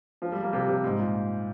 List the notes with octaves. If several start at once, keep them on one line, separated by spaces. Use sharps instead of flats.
F3
G3
A#3
C3
C3
G#2
A#2